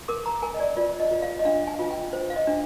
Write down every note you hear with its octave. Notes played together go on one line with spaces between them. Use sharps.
A#4 D6
A#5
A#4 G#5
D#5
D5
F4 D5
D#5
F4
F5
D#5
D4 F5
G#5
F4
G5
C5
F5
D#5
D4